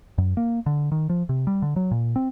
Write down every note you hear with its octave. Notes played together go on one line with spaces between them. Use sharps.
F#2
A#3
D3
D#3
F3
C3
G3
D3
F#3
A#2
C4